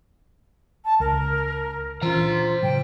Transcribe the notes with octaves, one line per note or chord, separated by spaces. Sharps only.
A5
C#2 A#4
E3 C#4 F4 C5 A#5
A2 C#3 F#3 G5